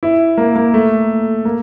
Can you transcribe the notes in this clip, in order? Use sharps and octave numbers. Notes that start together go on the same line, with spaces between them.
E4
A#3
A#3
A3
A#3